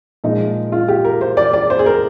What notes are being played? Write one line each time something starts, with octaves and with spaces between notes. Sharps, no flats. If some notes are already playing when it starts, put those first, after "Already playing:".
A#2 F3 G#3 D#4
F4
G4
A#4
C5
D5
D5
C5
G#4
A#4